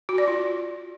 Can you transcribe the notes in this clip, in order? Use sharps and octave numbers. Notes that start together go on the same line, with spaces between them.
F#4
D5
F4